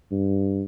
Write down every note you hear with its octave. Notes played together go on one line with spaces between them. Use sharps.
G2